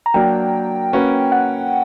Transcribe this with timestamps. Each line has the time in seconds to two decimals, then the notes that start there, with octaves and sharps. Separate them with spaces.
0.06 A#5
0.14 F#3 A#3 D4 A#4 G5
0.93 A#3 C#4 F#4 B4
1.32 F#5